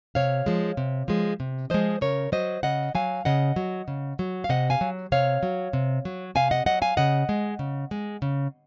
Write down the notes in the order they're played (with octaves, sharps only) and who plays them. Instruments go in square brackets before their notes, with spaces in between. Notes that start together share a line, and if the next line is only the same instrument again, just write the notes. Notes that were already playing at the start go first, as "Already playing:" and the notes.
[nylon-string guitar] C3 C#5 F5
F3 G#3
C3
F3 G#3
C3
F3 G#3 C5 D#5
C#3 A#4 C#5
F#3 C5 D#5
C#3 D#5 F#5
F#3 F5 G#5
C#3 D#5 F#5
F#3
C#3
F#3
F5
C3 D#5 F#5
F5 G#5
F#3
C3 C#5 F5
F#3
C3
F#3
C3 F5 G#5
D#5 F#5
F#3 D#5 F#5
F5 G#5
C#3 D#5 F#5
G#3
C#3
G#3
C#3